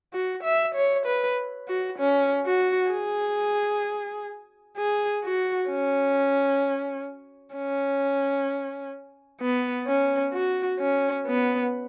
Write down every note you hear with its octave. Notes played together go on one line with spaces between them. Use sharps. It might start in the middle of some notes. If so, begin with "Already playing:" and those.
F#4
E5
C#5
B4
F#4
C#4
F#4
G#4
G#4
F#4
C#4
C#4
B3
C#4
F#4
C#4
B3